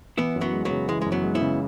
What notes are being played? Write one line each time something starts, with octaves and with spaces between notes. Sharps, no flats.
E3 B3 E4
F#2
F#3 B3
G#3
F#3 B3
C#3
E3 G#3
F#2 G#3
F#3 B3
G#3
B3 E4
C#3